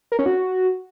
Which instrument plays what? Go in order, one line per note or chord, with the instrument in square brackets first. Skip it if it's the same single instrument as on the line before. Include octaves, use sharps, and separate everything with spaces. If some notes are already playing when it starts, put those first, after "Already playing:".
[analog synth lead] A#4
C#4
F#4